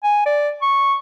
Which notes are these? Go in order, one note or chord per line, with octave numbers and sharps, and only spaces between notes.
G#5
D5
C#6